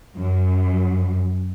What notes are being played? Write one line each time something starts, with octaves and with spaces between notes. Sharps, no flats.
F#2